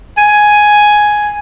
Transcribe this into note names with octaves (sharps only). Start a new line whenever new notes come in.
G#5